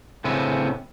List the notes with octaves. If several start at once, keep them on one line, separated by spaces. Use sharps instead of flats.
A2 C#3 C4 C#4 B4 E5